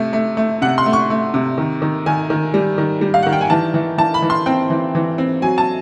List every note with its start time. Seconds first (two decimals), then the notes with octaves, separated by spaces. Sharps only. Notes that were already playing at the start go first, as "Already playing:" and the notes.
Already playing: C3 A3
0.13 A3
0.37 A3
0.62 C3 F#5
0.78 C6
0.86 A3
0.93 C#6
1.10 A3
1.34 C3
1.58 D#3
1.82 D#3
2.06 D#3 G#5
2.30 D#3
2.54 G3
2.78 D#3
3.01 G3
3.14 F5
3.23 D#3 F#5
3.33 G5
3.41 G#5
3.50 E3 A5
3.74 E3
3.98 E3 A5
4.14 B5
4.22 E3
4.30 C6
4.46 C4 G5
4.70 E3
4.95 E3
5.18 C4
5.42 F#3 G#5
5.58 A5